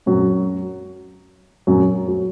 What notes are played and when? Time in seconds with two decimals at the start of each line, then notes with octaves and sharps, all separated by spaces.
0.06 F#2 F#3
1.67 F#2 F#3
2.08 F#3